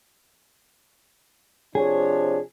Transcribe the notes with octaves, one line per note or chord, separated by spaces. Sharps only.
C3 F3 D4 G#4 C#5